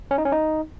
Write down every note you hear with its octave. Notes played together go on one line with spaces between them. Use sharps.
C#4
D#4
C#4
D#4